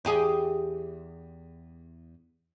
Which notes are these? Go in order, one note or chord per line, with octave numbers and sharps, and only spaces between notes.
E2 G4 G#4